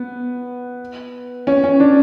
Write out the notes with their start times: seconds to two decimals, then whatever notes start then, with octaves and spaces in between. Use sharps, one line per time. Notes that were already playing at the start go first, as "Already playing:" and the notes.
Already playing: B3
1.47 C#4
1.64 C#4
1.80 D4